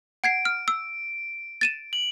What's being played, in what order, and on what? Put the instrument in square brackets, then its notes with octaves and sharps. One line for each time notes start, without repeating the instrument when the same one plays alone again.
[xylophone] F#5 G#6 C7 [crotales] D7
[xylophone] F6
E6
A6 D#7 E7
[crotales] F#7